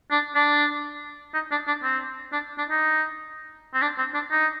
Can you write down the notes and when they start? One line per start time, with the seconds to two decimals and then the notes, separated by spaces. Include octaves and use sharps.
0.11 D4
0.35 D4
1.34 D#4
1.51 D4
1.67 D4
1.83 C4
2.33 D4
2.58 D4
2.70 D#4
3.74 C4
3.82 D4
3.98 C4
4.14 D4
4.31 D#4